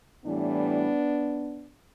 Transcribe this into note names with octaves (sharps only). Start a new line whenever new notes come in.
A2 E3 G3 B3 D4